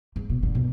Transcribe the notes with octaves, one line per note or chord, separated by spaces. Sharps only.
G#2
B2
D3
B2